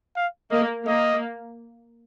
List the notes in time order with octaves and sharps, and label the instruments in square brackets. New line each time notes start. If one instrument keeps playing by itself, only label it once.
[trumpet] F5
[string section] A#3 [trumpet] D#5
[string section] A#3 [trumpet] D#5